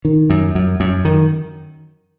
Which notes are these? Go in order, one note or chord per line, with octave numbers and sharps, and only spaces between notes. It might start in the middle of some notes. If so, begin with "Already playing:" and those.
D#3
F#2
F#2
F#2
D#3